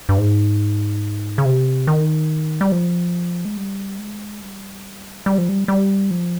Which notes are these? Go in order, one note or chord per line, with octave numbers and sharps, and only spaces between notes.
G2
G#2
C#3
C3
D#3
G3
F3
G#3
G3
G#3
G3
G3
F3
G3
G3
F3